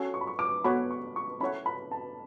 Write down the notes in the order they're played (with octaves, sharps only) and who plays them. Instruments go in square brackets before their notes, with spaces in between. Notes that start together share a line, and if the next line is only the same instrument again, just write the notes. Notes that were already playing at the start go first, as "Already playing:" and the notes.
Already playing: [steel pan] C#4 F#4 A4 C#5
[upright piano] C#6
B5
C#6
D6
[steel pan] B3 F#4 A4 C#5 F#5 [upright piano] B5
[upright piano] C#6
C#6
[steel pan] C#4 E4 A4 C#5 F#5 [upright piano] B5
[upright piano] B5
A5